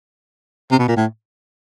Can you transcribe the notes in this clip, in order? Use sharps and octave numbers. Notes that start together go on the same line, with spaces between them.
C3
B2
A#2
A2